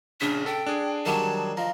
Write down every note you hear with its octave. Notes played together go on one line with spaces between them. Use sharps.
A#1 C#3 D4 B6
A4 G5
D4 G#4
D#3 F#3 G3 A5
F3 D#5 A#5